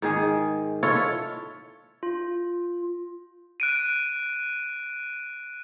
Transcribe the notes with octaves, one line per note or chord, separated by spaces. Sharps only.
G#2 D#3 G#4
E4 F4 A4 C#5
F4
F#6 D7 D#7